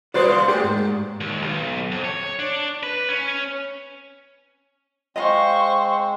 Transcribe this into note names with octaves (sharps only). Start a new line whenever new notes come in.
A#2 G3 F#4 B4 C5 D5
F5 C6
A3 A#3 G4 G#4
G#2
D#2
B1
F2
C#5
D4
B4
C#4
G#3 C4 C5 D#5 F5 C#6